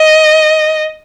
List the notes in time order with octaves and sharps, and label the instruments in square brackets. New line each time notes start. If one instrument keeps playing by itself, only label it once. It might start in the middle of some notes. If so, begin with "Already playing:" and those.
Already playing: [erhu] D#5